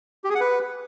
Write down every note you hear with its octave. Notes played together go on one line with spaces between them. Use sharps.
G4
G#4
F#5
B4